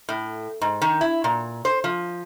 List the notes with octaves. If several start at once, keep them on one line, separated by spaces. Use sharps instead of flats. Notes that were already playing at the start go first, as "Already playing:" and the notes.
A2
G#2
D#3
E4
A#2
C5
F3